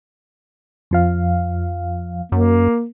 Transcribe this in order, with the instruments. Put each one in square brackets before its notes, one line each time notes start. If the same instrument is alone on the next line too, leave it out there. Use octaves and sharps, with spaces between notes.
[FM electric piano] F2 F3 F5
[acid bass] F#2 [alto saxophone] A#3